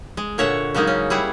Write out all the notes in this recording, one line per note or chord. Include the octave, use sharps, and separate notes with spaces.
G#3
A#2 D3 C#5 E5 F#5
C#3 F#3 G#3 A#3 D#4
C#4
G3 E4 G#4 F#5